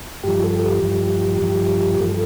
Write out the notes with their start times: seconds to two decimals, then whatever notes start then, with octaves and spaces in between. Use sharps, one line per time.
0.23 G2 F3 G4
0.44 A4
0.63 G4
0.83 G2 F3
1.41 G2 F3
2.00 G2 F3 A4